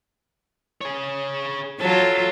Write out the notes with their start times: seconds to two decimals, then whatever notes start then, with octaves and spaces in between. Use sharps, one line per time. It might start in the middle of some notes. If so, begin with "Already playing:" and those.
0.81 G#4 C#5
1.81 F#3 F4 A4 A5